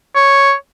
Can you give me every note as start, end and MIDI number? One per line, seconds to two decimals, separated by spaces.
0.15 0.53 73